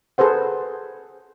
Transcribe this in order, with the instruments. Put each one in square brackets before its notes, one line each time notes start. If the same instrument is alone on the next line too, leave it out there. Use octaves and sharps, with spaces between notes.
[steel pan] G#4 A4 B4 C5 F#5